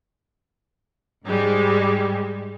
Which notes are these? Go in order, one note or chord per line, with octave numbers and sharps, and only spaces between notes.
G#2 G3 G#3